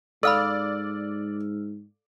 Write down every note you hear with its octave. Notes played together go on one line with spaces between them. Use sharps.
G#2 A4 D5 F5 B5 E6 F6